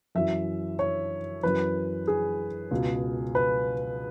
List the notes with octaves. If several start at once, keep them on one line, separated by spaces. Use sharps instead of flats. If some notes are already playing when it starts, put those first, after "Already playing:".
F#2 E3 E5
C#5
F#2 E3 B4
G#4
C#2 B2
B4